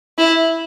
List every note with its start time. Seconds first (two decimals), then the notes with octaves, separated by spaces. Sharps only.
0.18 E4